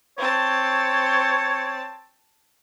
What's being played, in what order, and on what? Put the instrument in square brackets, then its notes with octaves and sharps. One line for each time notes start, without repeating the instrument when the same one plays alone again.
[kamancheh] C4 A5 [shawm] C#5